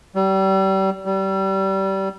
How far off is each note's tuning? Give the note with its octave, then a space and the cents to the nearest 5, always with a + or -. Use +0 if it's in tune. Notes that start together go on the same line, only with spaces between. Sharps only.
G3 -30
G3 -25